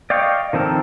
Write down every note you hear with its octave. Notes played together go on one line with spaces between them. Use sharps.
D5 D#5 F5 G5 C#6
D#3 F3 C4 A4 A#4